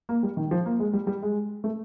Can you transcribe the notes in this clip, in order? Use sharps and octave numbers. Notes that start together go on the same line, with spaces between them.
A#3
G3
D#3
F3
A#3
G#3
G3
G3
G#3
A3